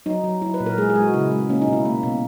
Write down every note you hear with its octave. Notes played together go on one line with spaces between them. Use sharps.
F#3 D#4
F#3
F#3 E4
B4
A#2
A#4
G#3 G#4
G#4
G#3
F#4
C#3 E4
G#3
A#3 C#4
D#4
B2
E4
A#3
B2